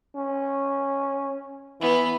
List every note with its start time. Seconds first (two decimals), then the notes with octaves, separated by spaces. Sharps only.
0.16 C#4
1.81 E3 B3